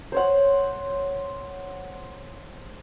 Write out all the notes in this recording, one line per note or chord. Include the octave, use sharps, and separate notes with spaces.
C5 C#5 F#5